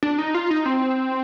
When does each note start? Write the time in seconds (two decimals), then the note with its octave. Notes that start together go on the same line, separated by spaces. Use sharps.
0.03 D4
0.19 D#4
0.35 F4
0.51 D#4
0.66 C4